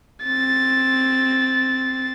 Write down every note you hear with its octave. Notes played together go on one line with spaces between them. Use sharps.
C4 A6